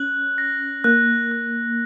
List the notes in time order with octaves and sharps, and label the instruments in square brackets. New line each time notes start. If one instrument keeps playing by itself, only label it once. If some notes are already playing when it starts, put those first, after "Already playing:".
Already playing: [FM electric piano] C#4 [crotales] F#6 F#7
[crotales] A#6
[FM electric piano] A#3 [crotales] F#6
[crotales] F#6